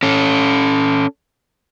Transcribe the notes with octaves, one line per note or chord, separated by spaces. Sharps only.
C#4 A4